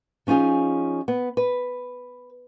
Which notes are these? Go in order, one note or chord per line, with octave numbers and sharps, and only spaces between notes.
F3 C#4 D#4 F4 G#4
B3
B4